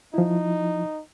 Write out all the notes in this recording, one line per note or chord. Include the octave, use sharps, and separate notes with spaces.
F3 D#4 E4